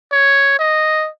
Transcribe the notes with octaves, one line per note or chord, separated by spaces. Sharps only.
C#5
D#5